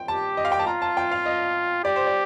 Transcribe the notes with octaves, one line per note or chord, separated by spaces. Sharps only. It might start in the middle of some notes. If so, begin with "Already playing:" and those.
Already playing: G5
G4 A5
D#5
F5
G5
A5
F4 A#5
A5
G5
F5
D#5
G4 D5
C5
D5